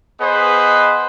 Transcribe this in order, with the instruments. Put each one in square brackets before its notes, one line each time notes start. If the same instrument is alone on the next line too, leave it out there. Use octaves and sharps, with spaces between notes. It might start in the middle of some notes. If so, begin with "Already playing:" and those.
[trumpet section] B3 G#4 B4 C5 D#5